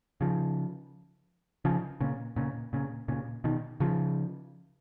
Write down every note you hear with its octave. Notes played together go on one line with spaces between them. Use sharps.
C#3 F3
C#3 F3
A#2 C#3
A#2 C#3
A#2 C#3
A#2 C#3
B2 D#3
C#3 F3